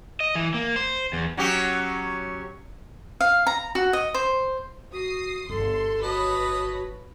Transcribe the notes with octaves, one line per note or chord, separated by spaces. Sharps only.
D#5
E3
A#3
C5
E2
F#3 C#4 G4
F5
A#5
F#4
D#5
C5
F#4 D#6 C7
D1 G1 A4 C6
F#4 B4 C#5 D#5 A5 B5